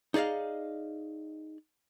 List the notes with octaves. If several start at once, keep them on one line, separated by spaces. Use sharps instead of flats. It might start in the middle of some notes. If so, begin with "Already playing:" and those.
D#4 G#4 D5 D#5 F5